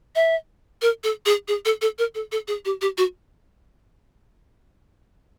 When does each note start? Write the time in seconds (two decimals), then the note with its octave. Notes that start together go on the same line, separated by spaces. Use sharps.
0.15 E5
0.82 A#4
1.04 A4
1.26 G#4
1.48 G#4
1.65 A4
1.82 A4
1.99 A#4
2.15 A4
2.32 A4
2.48 G#4
2.65 G4
2.81 G4
2.98 F#4